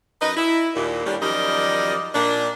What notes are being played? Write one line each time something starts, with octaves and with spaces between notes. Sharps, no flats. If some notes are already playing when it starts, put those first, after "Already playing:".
F#2 D#4 B4 D#5
E4
D#2 A#2
D#2 A2 G3 C#4 D4
F#2 D#3 F3 G3 D5 D#5
A#2 D4